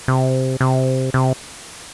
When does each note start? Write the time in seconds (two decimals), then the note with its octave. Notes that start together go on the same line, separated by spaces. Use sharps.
0.08 C3
0.61 C3
1.14 C3